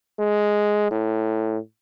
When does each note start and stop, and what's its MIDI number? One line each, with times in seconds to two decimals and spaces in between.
0.19 0.87 56
0.91 1.58 45